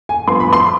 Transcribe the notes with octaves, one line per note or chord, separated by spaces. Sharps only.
G#5
G2 F3 B3 C6
B5
C6